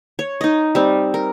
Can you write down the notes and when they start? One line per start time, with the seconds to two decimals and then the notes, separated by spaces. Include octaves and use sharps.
0.19 C#5
0.41 D#4 D#5
0.75 G3 C4
1.14 A#4